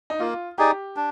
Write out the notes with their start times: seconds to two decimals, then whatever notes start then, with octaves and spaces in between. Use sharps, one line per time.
0.10 D#4
0.20 A#3 F4
0.58 D#4 G4 G#4 D5
0.96 D4